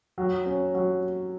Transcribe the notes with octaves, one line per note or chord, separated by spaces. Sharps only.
F#3
C#4
F#3